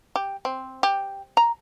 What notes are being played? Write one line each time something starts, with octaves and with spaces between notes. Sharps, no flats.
G4
C4
G4
A#5